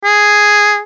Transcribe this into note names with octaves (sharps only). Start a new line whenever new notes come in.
G#4